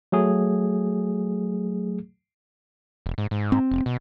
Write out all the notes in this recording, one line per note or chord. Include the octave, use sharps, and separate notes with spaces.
F#3 A3 G#4
E1
G#2
G#2
C4
F1
B2